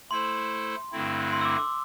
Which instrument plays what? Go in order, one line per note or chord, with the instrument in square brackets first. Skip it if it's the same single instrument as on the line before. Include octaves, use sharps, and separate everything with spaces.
[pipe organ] A3 E4 A4 C5 [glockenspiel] C6
[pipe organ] G2 D3 A3 C4 E4
[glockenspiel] C6
E6
D6
D6